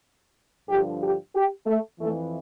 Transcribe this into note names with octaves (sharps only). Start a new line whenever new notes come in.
G2 D3 F3 G4
G4
G4
A3
F2 E3 A3